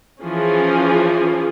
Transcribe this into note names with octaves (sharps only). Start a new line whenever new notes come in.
E3 F3 C#4 G#4